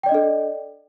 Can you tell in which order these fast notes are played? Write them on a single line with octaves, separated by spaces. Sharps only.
G5 D5 D#5 D4 A4